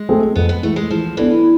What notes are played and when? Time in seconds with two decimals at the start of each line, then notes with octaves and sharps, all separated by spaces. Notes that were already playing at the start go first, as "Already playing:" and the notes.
Already playing: G#3
0.09 A3 C4 G#4
0.36 F2 B3
0.49 B3
0.63 E3 G#3 A3
0.76 G#3
0.91 E3 F3
1.17 E3 B3 D4 A4